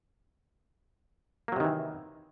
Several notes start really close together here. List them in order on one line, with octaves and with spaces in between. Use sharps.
A#3 F#3 C3 D#3 E3